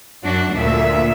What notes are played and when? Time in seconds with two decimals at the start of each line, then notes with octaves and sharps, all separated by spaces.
0.22 F#2 D4 F#4
0.52 D2 A#2 E5